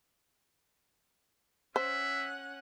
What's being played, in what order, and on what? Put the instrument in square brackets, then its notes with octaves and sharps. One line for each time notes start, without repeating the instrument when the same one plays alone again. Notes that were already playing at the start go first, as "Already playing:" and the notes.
[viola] C#4 F#5 [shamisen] C5 [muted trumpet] E5